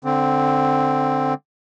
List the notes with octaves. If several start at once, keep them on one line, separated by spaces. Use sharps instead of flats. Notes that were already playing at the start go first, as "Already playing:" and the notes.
D3 C4